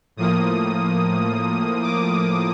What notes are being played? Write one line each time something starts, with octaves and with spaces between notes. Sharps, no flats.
A2 F3 A#3 D#6
D6